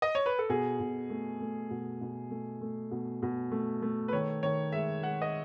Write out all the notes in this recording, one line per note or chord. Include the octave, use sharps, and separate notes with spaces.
D#5
C#5
B4
A4
B2 G#4
B2
A3
A3
B2
B2
A3
A3
B2
B2
A3
A3
B4
D#3 C#5
D#3 C#5
G#3 E5
G#3 F#5
D#5